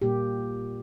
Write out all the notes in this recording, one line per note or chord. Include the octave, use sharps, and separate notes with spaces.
A#2 G3 A#3 G4